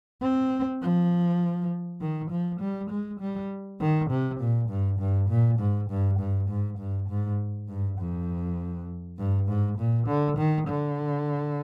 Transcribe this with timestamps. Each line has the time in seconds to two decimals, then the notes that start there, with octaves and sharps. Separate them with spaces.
0.22 C4
0.82 F3
2.01 D#3
2.31 F3
2.60 G3
2.90 G#3
3.20 G3
3.81 D#3
4.11 C3
4.40 A#2
4.69 G2
5.00 G2
5.29 A#2
5.60 G#2
5.90 G2
6.19 G2
6.49 G#2
6.79 G2
7.09 G#2
7.69 G2
7.99 F2
9.18 G2
9.48 G#2
9.78 A#2
10.07 D3
10.37 D#3
10.68 D3